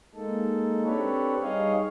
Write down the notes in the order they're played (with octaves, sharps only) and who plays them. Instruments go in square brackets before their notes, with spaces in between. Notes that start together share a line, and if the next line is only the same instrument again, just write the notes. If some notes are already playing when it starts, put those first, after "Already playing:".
[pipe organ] G#3 A#3 D#4 A4
C4 D4 G4 A4 B4 C#5
G3 D#4 G#4 C#5 D#5 F5